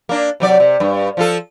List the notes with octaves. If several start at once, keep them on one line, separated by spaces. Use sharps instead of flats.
A#3 D4
C3 F#3 D5
C3
G2
F3 F4 A4